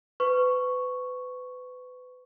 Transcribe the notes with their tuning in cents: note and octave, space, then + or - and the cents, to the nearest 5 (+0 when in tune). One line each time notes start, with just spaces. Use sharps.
B4 +30 C#6 +0